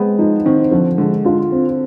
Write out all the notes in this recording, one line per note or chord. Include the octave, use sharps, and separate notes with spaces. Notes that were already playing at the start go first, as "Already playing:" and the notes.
Already playing: G#3 B3 C4
F3 D#4
D#3 C4
D3 F3
D3 G#3
D3 F4
C4